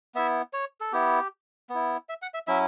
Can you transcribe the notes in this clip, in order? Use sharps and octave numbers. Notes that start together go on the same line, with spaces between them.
B3 E4 E5
C#5
A4
B3 E4 G4
B3 E4
E5
F#5
E5
F#3 C#4 E4 E5